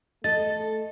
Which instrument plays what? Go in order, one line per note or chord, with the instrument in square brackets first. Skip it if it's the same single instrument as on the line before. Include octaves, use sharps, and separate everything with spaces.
[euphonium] A3 [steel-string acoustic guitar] A4 [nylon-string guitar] D#5 [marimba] A6